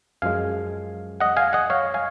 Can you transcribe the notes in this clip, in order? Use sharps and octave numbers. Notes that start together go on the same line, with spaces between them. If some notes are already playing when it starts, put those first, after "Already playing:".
F#2 F3 G#3 F5 G#5
D#5 F#5
F5 G#5
D#5 F#5
C#5 F5
F5 G#5